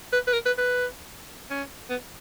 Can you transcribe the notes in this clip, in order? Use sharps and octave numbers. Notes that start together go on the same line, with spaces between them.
B4
B4
A#4
B4
B4
C#4
B3